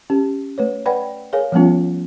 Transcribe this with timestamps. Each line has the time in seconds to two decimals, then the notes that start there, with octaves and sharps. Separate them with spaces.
0.10 C#4 G4
0.58 A3 B4 C#5
0.86 B4 D5 F#5 G5 B5
1.33 G#4 A#4 C#5 F5 G#5
1.52 F3 G3 A3 B3 C#4 F4